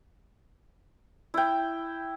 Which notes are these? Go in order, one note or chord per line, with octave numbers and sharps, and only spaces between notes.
E4 G5